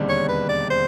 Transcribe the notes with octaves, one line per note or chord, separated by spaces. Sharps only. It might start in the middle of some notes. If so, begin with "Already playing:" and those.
Already playing: E1 D#2 D3 G3 C4
C#5
B4
D5
C5